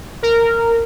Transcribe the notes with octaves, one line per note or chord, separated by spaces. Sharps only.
A#4